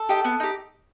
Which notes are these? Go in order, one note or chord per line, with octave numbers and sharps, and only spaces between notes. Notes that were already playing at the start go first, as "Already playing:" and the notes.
Already playing: A4
D#4 G4
B3
D#4 G4